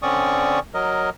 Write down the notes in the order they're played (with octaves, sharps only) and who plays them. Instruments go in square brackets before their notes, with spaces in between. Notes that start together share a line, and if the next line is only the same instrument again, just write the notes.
[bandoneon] D3 C4 C#4 D5 C#6 D#6
F#3 A#4 D#5